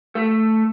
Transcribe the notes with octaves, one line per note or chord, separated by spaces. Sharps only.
A3